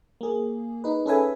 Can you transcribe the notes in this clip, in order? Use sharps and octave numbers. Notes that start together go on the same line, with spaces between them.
A#3 G#4
D#4 B4
C#4 G#4 A4 B4 E5 G#5